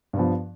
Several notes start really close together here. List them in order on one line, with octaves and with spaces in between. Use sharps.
G2 B3 F3